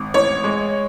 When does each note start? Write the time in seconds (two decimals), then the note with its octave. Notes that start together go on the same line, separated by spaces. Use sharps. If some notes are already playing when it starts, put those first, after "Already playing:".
Already playing: G#1
0.14 A1 C#5
0.44 G#3